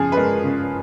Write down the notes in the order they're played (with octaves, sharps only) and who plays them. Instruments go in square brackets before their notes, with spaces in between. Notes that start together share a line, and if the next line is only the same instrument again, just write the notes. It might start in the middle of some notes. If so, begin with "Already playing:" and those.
Already playing: [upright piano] C#3 F3 G#4
B4
G#3 A#4
C#3